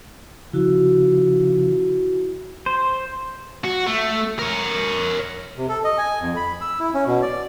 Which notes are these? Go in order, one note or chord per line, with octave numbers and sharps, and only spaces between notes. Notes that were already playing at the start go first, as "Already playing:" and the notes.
C#3 F3 E4 F#4
C5
F#4
A3
A#4 C#5
C3
A4
D#5
G#5
F2
B5
E6
E4
C#4
B2
D5